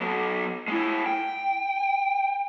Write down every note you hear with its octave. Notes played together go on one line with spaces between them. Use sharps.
F#3 B3
G#3 E4
G5